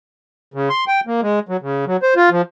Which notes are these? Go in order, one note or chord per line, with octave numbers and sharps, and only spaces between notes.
C#3
C6
G5
A#3
G#3
F#3
C#3
F#3
C5
F4
F3